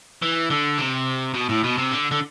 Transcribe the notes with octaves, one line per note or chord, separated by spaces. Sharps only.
E3
D3
C3
B2
A2
B2
C3
D3
D3